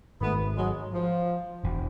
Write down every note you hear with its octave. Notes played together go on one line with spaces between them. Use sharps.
G#1 G#2 D#3 A3 B3
F#3 G#3
F3
E1 E2 B2